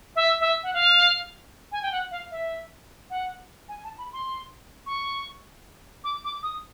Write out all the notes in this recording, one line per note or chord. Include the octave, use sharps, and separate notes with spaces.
E5
E5
F#5
F5
G#5
G5
F#5
F5
E5
F#5
G#5
A5
B5
C6
C#6
D6
D6
D#6